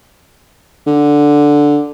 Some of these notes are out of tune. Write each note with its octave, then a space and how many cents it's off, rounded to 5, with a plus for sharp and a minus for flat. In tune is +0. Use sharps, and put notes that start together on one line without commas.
D3 +0